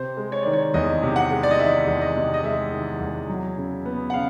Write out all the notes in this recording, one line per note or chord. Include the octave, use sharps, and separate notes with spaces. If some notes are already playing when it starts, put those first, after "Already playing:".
Already playing: C3 C5
G#3
C#5
D#3 D5
C#5
E2 D#5
C3
F#5
G#3
D5
D#5
D#3 E5
E2
D#5
C3
D#5
G#3 E5
D#3
E2
F#3
C#3
B3
F#5
C#3 F5